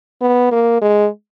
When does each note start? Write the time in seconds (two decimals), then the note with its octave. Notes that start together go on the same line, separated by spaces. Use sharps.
0.22 B3
0.52 A#3
0.82 G#3